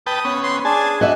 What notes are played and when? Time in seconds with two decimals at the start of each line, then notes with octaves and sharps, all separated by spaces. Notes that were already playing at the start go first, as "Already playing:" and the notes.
0.07 B4 G5 A5 D#6
0.25 B3 C#4
0.43 C6
0.65 D4 G#4 G#5 A5
1.01 F#4 D#5 E5 G#5